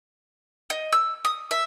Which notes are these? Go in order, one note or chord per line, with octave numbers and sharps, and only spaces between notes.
D#5
E6
D#6
E5